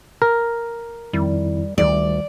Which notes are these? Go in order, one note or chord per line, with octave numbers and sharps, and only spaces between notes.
A#4
F2 D#3 G3 E4
D2 D#3 G3 D5